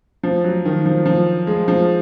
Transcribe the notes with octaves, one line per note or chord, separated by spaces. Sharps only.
F3
F#3
D#3
F3
F3
G#3
F3